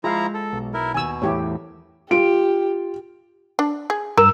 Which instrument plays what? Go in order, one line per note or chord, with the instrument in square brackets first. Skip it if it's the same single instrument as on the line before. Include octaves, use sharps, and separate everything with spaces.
[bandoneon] F3 E4 A#5 [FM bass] G#3 [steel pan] F4 F5
[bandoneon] A4
[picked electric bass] B1
[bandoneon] E4 A#4
[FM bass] D#2 [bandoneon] B2 [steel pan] G#5 E6
[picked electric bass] E2 A2 [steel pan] E4 G4 C#5
[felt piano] F4 D7 [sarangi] G4
[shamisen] D4
G#4
[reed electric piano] G2 E6 [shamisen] A#4 A#5